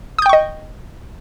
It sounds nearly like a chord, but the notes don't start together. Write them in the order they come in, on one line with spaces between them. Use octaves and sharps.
D#6 G6 G5 C#6 D#5